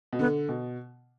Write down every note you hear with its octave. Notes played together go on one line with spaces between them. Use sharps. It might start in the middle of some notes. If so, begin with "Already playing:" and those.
B2
D3 B3
B2